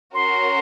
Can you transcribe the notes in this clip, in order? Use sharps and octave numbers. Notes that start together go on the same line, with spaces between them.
C#4 F#4 A#4 C6